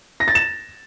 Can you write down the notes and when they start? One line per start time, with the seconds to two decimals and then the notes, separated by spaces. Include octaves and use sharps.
0.20 A#6
0.28 A6
0.35 E7